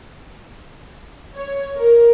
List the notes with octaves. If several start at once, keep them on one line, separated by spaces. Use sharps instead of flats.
C#5
A#4